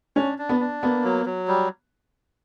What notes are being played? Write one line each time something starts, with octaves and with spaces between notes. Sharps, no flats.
C#4 D4
D4
B3
D4
A#3 B3
F#3
F#3
G3